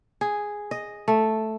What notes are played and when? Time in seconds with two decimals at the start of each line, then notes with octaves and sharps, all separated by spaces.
0.21 G#4
0.71 D#5
1.08 A3